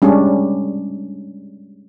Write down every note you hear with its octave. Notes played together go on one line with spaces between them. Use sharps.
G3 G#3 C#4 D4